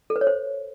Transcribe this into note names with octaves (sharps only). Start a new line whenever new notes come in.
A4
B4
C#5
C5